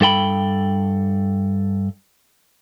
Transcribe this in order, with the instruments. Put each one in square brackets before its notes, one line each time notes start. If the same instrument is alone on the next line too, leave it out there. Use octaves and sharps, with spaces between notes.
[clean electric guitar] G2 A4 G5 B5